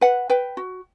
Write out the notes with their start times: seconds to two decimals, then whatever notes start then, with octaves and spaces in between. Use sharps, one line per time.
0.01 B4 F#5
0.30 B4 G5
0.57 F#4